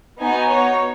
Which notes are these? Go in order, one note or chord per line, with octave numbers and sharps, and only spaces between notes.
B3 D#4 F#4 G#5
C#5